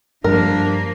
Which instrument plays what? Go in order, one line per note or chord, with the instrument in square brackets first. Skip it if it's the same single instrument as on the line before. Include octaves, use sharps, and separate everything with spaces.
[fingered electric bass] G2 G3 [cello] F3 A#3 [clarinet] D4 [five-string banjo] A#4